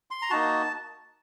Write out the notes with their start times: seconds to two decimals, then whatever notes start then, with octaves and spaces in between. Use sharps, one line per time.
0.11 C6
0.22 A#5
0.30 A#3 D#4 F#4 A5